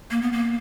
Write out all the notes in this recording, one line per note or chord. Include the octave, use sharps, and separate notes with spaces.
A#3
B3
A#3